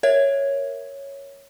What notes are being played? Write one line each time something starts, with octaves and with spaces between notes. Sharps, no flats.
A#4 C#5 E5 G#6